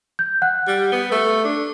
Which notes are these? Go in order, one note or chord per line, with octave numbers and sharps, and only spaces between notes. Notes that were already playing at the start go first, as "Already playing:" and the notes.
G6
F#5 F#6
G3
B3 G7
A3
D4